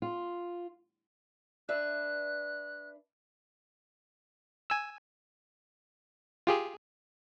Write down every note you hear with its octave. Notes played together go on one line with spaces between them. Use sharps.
F4
D4 B4 E5 F#6
G#5 E6
F4 G4 G#4